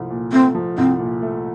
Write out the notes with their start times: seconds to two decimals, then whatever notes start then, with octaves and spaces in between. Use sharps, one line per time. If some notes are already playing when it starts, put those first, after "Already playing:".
Already playing: C2 F3 A3
0.10 A#2
0.32 A3 C4
0.55 F3
0.78 C2 C4
0.99 A#2
1.22 A3